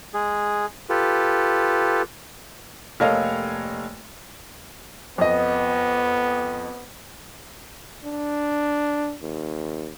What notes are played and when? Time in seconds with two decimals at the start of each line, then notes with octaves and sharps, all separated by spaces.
0.14 G#3 G#4
0.89 F4 G4 A4 B4
3.00 F1 A#3 A4 C#5 D#5 F5
5.18 F2 B3 D#5
8.04 D4
9.21 D#2